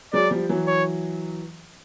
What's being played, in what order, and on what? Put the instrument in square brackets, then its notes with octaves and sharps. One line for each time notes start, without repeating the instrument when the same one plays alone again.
[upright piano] F#3 G#3 [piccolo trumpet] D5
[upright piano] F3 G3
E3 F#3
[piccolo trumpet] C#5